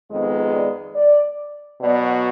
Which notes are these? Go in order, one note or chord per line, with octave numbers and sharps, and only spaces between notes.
F2 D#3 G#3 B3 D#5
D5
D5
B2 F#3 B3 D5